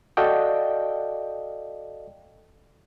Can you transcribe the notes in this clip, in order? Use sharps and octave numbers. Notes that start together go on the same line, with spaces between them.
F#4 A4 D5 D#5 F5 G5